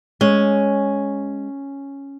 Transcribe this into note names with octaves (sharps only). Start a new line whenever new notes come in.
G#3 C#4